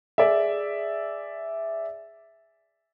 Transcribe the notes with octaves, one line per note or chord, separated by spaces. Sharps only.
G#4 D5 E5